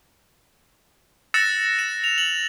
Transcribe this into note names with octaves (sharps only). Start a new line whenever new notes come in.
E6 F#6 A6 A#6 C#7 E7
E7
F7
F#7